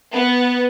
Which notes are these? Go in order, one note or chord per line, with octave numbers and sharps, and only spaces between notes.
B3